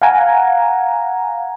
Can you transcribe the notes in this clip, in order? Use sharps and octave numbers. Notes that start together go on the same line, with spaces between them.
F5 F#5 G#5 A#5